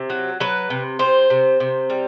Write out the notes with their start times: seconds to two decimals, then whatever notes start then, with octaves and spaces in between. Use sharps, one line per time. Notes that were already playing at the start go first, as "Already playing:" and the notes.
Already playing: C3
0.10 F#3
0.40 F#3 B4
0.70 C3
0.99 C3 C5
1.30 C3
1.60 C3
1.90 G3